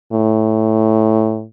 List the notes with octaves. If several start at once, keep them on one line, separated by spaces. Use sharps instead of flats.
A2